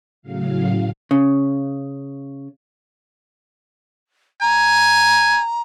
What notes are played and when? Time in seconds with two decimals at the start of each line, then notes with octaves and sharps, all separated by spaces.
0.22 A2 C#3 F#3 F5
1.11 C#3
4.41 G#5 A#5